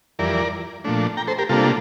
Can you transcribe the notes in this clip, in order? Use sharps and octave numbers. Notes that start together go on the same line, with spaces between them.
F2 E3 G3 A#4 D5
A#2 F3 A3 D4
G5 A#5
A4 C5
G4 A#4
C3 G3 A#3 D4 F4 A4